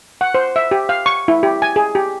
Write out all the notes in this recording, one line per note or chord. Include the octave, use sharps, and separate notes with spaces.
F#5
C5
E5
G4
F5
C#6
E4
G4
G#5
G#4
G4